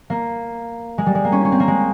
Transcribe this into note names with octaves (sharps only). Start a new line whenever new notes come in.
A#3
G#3
G3
G#3
A#3
C#4
C#4
C4
A#3
G#3